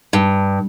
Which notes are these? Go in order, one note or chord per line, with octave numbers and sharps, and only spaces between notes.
G2